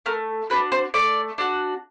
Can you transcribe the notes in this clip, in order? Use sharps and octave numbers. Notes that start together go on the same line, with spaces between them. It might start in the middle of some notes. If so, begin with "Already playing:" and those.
A3 A#4
D4 F#4 B4
C5
A3 D5
D4 F#4